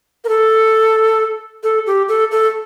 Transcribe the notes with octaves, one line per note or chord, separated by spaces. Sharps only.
A#4
A4
A4
G4
A4
A4